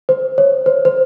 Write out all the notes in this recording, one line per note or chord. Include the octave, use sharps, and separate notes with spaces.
C5
C#5
C5
C5